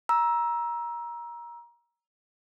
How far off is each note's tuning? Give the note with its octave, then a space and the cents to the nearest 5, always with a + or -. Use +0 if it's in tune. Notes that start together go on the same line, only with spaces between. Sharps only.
A#5 +25 E6 +0